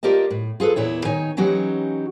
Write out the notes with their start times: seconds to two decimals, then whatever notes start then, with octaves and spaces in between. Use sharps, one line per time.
0.03 F4 G4 A#4 D5 D#5 A5
0.30 A2
0.60 F4 G#4 A4 B4
0.76 E2 A#2 E4 C#5
1.05 D#3 D#4 C#5 G#5
1.37 E3 F#3 C#4 D#4 F#4 G4